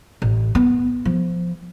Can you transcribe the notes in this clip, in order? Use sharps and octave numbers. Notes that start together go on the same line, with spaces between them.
A1
B3
F3